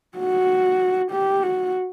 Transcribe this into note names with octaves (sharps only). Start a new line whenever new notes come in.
F#4
G4
F#4